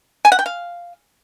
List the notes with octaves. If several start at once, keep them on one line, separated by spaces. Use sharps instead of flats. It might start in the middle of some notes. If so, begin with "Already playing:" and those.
G#5
F#5
G5
F5